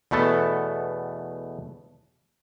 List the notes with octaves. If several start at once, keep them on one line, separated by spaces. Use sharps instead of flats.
E2 B2 A3 B3 A4